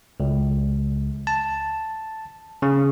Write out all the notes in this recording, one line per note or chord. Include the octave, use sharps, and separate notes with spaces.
C#2
A5
C#3